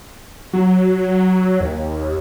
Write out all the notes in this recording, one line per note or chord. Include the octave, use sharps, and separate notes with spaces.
F#3
D#2